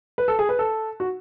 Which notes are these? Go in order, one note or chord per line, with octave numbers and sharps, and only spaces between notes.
B4
A4
G#4
B4
A4
F#4